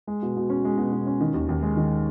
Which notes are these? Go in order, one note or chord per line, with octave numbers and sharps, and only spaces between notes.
G#3
B2
B2
C#4
G#3
B2
B2
C#4
D#3
D#2
D#2
G#3
D#3